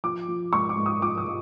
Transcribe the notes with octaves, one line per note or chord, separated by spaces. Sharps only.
F3 D6
F3
G#2 C#6
D6
G#2
D#6
F3 D6
D#6
F3